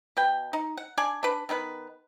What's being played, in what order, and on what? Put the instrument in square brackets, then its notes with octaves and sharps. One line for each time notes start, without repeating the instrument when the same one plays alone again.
[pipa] B2 B4 G5
D#4
F#5
D4 D5 G#5
D4 B4
D#3 B3 E4 B4